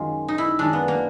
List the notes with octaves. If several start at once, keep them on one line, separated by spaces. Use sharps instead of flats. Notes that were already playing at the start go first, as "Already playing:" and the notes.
Already playing: F#2 D#3 G#3 F4
D#4
E4
F#2 D#3 G#3 D4
B3
A#3